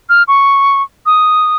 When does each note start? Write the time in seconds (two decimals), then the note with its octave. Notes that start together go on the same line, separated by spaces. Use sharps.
0.09 F6
0.28 C#6
1.06 D#6